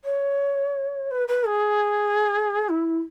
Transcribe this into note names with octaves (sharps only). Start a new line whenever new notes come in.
C#5
B4
B4
G#4
E4